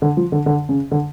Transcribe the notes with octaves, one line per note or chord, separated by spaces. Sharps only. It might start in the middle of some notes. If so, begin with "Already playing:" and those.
D3
F3
D3
D3
C#3
D3